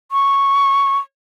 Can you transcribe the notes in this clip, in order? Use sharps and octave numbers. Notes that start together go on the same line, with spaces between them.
C#6